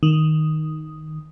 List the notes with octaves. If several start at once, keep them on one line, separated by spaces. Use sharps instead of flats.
D#3